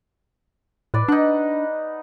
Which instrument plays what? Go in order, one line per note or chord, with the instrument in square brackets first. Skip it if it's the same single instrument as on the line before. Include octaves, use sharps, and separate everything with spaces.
[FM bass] A2 [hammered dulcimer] B4 D5
[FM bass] D4 [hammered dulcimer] D#4 F#5